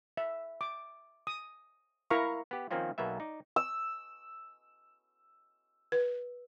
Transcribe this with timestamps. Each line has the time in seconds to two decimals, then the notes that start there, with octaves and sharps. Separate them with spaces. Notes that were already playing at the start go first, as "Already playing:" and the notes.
0.17 E5
0.61 D6
1.27 D#6
2.11 E4 A#4 F5 A#5 B5 C#6
2.51 B3 G4
2.71 D#3 F3 A#3 C4 C#4 F4
2.98 B1 B2 A#3 B3 E5
3.20 D#4 D5
3.56 E6
5.92 B4